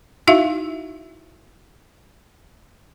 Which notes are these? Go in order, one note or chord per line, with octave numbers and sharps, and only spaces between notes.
D#4 E4 F#4 E5 F5